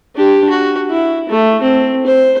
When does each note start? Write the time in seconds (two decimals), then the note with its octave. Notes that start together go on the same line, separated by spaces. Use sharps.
0.15 D4 G4
0.50 F#4
0.89 E4
1.29 A3
1.62 C4
2.07 C5